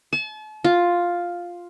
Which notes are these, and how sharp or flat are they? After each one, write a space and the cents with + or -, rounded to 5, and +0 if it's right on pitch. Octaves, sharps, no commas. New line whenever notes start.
A5 -40
F4 +5